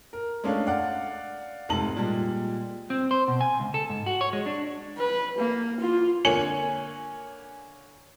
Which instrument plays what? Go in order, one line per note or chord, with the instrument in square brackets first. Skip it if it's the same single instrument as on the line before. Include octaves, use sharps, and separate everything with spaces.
[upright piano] A#4
G#3 A3 C#4 D4 C#5 F5
D5 F5 F#5
F1 G#2 A5 F#7
A#2 G3 G#3
[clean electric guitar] C4
C5
B2
G#5
C#2
A4
G#2
F#4
C#5
G#3
D4
[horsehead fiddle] B4
A#3
F4
[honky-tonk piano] D3 A#3 C#5 G#5 C#7 F#7